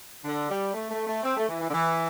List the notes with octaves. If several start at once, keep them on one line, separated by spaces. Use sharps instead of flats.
D3
G3
A3
A3
A3
C4
A3
E3
E3
D3
E3